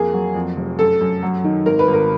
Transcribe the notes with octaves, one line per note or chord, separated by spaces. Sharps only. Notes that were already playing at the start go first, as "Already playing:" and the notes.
Already playing: F2 A#3 G#4
F#3
F2
F1
F#2 A4
F#2
F#3
D#3
G#1 A#4
B4
G#1
A#4